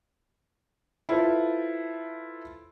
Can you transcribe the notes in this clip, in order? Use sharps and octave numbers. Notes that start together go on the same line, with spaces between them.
E4 F4 A4 B4 C5